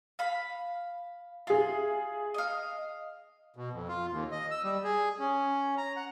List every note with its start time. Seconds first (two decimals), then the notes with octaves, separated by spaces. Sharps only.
0.19 F5 B5
1.47 F4 G#4 E5
2.34 D#5 F5
3.56 B2
3.73 F2
3.88 F4
4.12 D#2
4.32 D#5
4.51 E6
4.64 G3
4.84 G#4
5.19 C#4
5.78 A#5
5.96 F#5